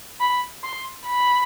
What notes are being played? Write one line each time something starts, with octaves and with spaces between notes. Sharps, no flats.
B5
C6
B5